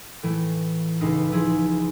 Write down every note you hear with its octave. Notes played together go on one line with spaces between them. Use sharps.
A2 E3 A3
C#2 A2 D#4 B4 F5
F3 E4 G#4